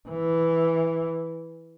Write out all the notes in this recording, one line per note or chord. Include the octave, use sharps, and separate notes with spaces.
E3